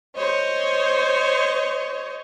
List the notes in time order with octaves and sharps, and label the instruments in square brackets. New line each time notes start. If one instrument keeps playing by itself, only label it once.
[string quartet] C5 C#5 D#5